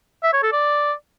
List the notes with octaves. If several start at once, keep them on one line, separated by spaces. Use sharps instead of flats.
E5
C#5
A4
D5